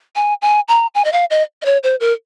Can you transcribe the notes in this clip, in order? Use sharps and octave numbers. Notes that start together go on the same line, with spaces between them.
G#5
G#5
A#5
G#5
D#5
F5
D#5
D#5
C#5
C5
A#4